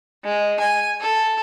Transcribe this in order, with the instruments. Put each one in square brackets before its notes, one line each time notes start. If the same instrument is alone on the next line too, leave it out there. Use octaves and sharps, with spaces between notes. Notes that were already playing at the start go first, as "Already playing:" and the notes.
[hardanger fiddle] G#3
G#5
A4